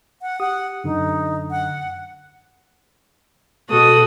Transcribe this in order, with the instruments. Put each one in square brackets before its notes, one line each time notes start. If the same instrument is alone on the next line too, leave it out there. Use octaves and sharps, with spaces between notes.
[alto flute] F#5
[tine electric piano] G4 D#6 [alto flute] F#5
[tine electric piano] F#2 D3 [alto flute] D#4
[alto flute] F#5
[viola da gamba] B2 F#4 [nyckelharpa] A4 D#6